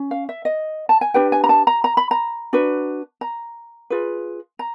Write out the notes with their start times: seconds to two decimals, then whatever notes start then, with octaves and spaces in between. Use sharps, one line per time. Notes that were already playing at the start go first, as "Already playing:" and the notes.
Already playing: C#4
0.11 F5
0.29 E5
0.45 D#5
0.89 A5
1.01 G#5
1.14 D4 G4 B4 G5
1.32 G#5
1.44 A#5
1.49 A5
1.67 A#5
1.84 A#5
1.97 B5
2.11 A#5
2.53 D4 F#4 B4
3.21 A#5
3.90 F4 G#4 B4
4.59 A#5